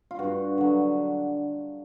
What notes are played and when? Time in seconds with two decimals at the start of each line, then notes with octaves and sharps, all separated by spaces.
0.11 F4
0.19 G2 F#4
0.58 D3 F#3